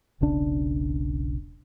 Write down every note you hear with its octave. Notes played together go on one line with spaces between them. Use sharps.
E1 B1 C#3 D4